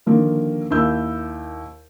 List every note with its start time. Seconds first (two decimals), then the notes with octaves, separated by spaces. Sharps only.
0.06 D3 D#3 F3 A#3
0.71 D#2 A#3 E4 E6 G6